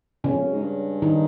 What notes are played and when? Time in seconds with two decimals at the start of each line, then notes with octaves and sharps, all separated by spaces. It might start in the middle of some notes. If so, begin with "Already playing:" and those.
0.24 E2 C#3 C#4
0.34 F2
0.44 F#2
0.53 G#2
0.62 G2
1.02 D#3 D#4